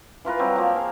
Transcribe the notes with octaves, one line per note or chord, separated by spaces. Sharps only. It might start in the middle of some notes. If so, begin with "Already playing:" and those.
E3 F4 A#4 B4
F#3 G3 C4
F3 A#3
G#4 F5